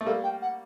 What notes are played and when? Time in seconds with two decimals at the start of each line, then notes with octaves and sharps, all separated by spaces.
0.01 A3
0.06 G3 A#3 A4
0.24 G5
0.42 F#5